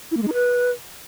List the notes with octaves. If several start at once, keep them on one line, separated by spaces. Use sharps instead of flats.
E4
A#3
G#3
D#4
B4